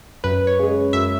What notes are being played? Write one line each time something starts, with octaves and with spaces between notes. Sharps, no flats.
F#2 B4
C#5
C#3 G#3
F#2 E5